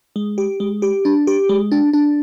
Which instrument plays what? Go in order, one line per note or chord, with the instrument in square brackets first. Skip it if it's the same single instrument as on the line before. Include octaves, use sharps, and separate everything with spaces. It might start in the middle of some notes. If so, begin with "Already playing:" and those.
[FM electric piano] G#3
G4
G#3
G4
D4
G4
G#3
D4
D4